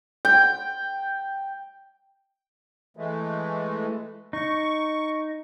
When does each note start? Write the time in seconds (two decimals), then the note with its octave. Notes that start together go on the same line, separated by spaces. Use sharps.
0.25 G5
2.97 E3 G#3 A3
4.33 D#4 C#6